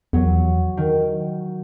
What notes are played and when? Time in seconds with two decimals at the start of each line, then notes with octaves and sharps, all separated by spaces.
0.13 E2 F#3
0.77 D#3